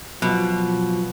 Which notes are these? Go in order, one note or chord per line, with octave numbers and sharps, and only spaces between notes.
B2 F3 F#3